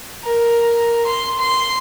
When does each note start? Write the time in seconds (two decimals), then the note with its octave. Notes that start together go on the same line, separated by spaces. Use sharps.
0.24 A#4
1.06 C6
1.40 C6